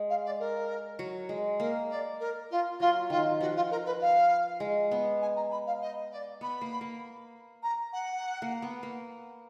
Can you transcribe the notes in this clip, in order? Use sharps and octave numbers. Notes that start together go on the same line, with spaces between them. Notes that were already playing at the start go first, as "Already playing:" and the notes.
Already playing: G#3
F5
D5
A#4
F#3
G#3
A#3 A#4
D5
A#4
F4
F#3 F4
D#3 F4
F3 F#4
F4
A#4
B4
F5
G#3
B3
G#5
A#5
B5
F5
D#5
D5
B3 B5
A#3
A#3
A#5
F#5
A#3
B3
A#3